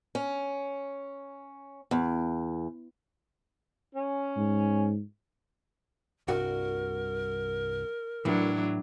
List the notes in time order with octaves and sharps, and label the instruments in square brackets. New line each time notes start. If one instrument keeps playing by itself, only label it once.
[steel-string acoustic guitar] C#4
E2
[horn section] C#4
[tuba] G#2
[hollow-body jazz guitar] C2 G2 F#4 [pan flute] A#4
[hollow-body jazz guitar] A2 E3 [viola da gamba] F#3 D4 E4